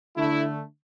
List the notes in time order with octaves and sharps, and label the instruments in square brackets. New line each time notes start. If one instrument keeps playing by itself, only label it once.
[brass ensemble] D3 A3 E4